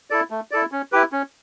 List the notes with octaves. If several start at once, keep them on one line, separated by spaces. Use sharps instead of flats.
E4 A4 D5
A3
E4 A4 D5
C#4
E4 G4 B4
C#4